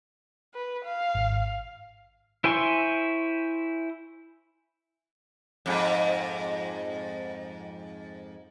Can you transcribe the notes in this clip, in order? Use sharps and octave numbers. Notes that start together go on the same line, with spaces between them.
B4
F5
G#1
E4 C5 G#5 C6 C#6
F2 G#2